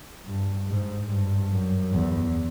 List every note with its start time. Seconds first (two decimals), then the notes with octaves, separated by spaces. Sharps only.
0.26 G2
0.68 G#2
1.10 G2
1.51 F#2
1.92 E2